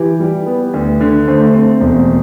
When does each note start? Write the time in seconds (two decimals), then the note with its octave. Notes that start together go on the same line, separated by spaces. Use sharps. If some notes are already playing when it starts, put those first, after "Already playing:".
Already playing: E3 G4
0.20 G3
0.46 B3
0.73 D2
1.01 D3
1.28 A3 C5
1.54 C4
1.81 E1